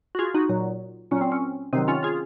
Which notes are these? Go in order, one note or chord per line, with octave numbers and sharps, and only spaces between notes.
F#4
F4 G#4
D#4 F#4
A#2 F#3
A#2 F#3 C#4
C4
C#4
C3 D#3 F#3 C4 D#4
C#4 F4
F4 G#4